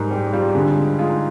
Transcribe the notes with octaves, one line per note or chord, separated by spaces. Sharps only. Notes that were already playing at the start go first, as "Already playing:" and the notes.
Already playing: G#2 G3 A#4
G3 G4
G3 F4
D3 G#4
G#3
G#3 F4
D#4